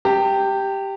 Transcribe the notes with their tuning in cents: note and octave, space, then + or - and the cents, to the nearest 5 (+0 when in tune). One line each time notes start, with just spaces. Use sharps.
G4 +0 A5 +45